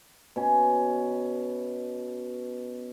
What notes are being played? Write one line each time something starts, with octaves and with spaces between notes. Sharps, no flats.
B2 C#4